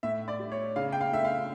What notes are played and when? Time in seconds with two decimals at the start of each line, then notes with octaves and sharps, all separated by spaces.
0.03 A2 E5
0.28 D5
0.39 G3
0.52 C#5
0.76 C#3 F5
0.92 G5
1.01 F5
1.12 A3 E5
1.24 F5